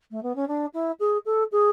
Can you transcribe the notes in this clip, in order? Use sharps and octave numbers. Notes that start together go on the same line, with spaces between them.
A3
B3
C#4
D4
E4
G#4
A4
G#4